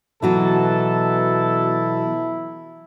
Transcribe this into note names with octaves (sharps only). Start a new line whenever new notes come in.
B2 E3 F#3 E4 F#4 A4 B4 A5